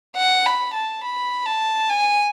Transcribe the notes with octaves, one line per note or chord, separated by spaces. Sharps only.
F#5
B5
A5
B5
A5
G#5